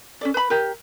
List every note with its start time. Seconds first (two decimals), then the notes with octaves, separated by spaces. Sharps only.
0.21 C#4 A4 D5
0.34 B4 B5
0.50 G4 A#4